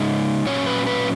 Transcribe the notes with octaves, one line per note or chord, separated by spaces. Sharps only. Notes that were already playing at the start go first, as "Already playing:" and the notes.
Already playing: C#3 G#3 D#4 C#5
A#2 F#3 C#4 C#5
B4
B4